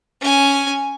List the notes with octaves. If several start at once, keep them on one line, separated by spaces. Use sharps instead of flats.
C#4 G#5